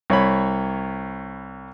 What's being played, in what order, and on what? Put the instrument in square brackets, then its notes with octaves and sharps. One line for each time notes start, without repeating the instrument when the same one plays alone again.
[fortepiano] C2 C#5 B5